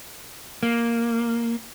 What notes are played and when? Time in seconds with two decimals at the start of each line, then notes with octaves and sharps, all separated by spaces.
0.63 A#3